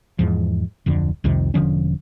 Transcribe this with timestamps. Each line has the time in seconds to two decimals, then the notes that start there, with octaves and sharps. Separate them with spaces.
0.19 E2 G#2 F3
0.86 D1 F2 D3
1.24 C2 F2 C3 D#3
1.54 E1 D3 F3 C#4